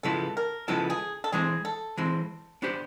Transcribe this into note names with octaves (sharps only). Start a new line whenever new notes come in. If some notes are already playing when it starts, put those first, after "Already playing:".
C#3 F3 G#3 B3 E4 A4
A#4
C#3 F3 G#3 B3 E4 A4
G#4
A4
E3 G#3 C4 G#4
A4
E3 G#3 C4
B3 D4 G4 C5